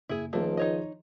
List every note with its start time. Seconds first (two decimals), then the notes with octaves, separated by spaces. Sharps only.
0.09 F#1 E4 G#4
0.33 C#2 D#3 F3 A3 A#3 G#4 A4
0.57 D#4 C#5 D#5